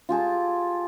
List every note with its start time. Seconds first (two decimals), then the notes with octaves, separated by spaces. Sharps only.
0.09 F4 G4 G#4 A5